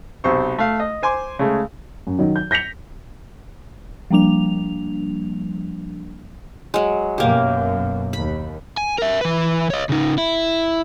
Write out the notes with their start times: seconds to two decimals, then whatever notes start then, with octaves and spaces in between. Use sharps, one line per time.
0.24 B1 C3 C5 C#6
0.58 A3 F5
0.80 D#5
1.02 C5 G#5 C6 D6
1.39 C#3 G#3 A3
2.07 F#2
2.19 D#3 F#3
2.36 G6
2.51 G6 A#6 B6 C#7 F7
4.10 F3 G3 A#3 D4 F7
6.74 F#3 G#3
7.18 F#2 B2 A#3 G4
8.13 D#2 B5
8.77 G#5
8.98 A#4 E5
9.21 E3 B4
9.70 C#5 D#5
9.89 C#3 D#4
10.18 E4